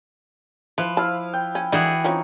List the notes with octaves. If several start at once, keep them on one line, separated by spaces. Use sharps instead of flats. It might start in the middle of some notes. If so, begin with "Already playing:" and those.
E3 F3 B4
E4 F5 A5
G5
C#4
D3 E3 G#3 D#4 F#4 G#4
F3 C4 C#4 D#4 C#5